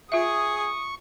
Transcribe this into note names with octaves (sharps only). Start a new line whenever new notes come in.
F4 G#4 E5 C#6 D#6